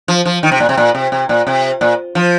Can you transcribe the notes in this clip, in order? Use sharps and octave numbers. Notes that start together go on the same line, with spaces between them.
F3
F3
D#3
C3
A#2
C3
A#2
C3
C3
A#2
C3
A#2
F3